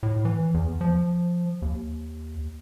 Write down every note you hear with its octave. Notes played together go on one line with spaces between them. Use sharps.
A2
E3
E2
F3
D#2